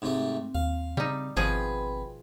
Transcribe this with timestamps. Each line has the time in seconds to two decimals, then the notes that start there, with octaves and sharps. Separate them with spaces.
0.02 G#2 C3 A3 C4
0.55 D#2 F5
0.97 C#3 G3 D#4
1.37 G#1 B2 F3 C4 G#4 B4 B5